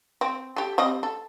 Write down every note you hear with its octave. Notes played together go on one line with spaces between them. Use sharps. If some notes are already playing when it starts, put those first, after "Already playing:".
C4
G4 A4
G3 C4 D#5
A4